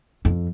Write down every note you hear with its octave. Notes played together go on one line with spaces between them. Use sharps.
F2